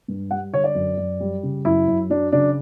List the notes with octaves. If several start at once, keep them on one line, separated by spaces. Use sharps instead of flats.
G2
G3 F#5
D3 C#5
D5
F#2
F#2
G3
C#3
F#2 E4
F#2
F#3 D4
C#3 D4